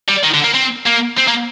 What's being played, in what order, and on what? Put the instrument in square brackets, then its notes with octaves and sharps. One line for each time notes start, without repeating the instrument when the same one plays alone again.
[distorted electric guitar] G3
D#3
D3
A#3
C4
A#3
C4
A#3